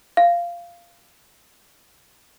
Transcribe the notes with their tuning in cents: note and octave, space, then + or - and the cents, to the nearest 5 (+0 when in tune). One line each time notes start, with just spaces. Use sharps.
F5 -10